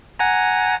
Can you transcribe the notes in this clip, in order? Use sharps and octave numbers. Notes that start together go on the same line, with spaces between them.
F#5 G#5 A#5